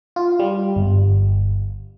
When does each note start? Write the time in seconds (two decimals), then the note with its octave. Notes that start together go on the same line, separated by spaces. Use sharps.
0.16 F4
0.40 G3
0.76 G1